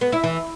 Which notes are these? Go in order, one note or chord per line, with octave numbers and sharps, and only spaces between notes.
B3
E4
E3